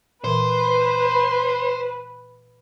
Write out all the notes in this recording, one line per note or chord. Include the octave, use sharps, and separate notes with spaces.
A#2 E3 B4 C5 C6